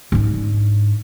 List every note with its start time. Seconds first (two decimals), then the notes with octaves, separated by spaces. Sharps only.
0.12 G#2 D4